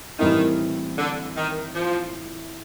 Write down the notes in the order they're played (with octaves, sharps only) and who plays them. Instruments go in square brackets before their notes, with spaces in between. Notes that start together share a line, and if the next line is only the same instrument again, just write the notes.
[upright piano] A2 E3 G3 C4 E4 [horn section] D#3
[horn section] D3
D#3
F3